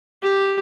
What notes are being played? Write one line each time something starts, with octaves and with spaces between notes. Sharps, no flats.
G4